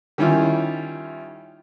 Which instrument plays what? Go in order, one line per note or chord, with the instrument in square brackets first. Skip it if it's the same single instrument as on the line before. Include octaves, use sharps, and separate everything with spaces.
[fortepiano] D#3 G3 C#4 E4 F4